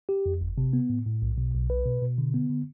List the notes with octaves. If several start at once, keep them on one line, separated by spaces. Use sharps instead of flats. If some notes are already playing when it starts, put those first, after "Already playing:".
G4
F2
G1
C3
B3
A2
A2
B1
B2
B1
B4
B2
B2
D3
B3
D3